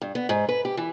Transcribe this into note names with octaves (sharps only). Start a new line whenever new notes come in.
G2
B3
G#2
B4
G4
E3